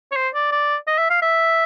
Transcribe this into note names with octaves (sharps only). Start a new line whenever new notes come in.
C#5
C5
D5
D5
D#5
E5
F5
E5